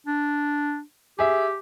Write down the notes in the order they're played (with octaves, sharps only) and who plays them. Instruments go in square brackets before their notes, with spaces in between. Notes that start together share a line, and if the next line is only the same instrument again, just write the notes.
[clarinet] D4
[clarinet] G4 [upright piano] G#4 E5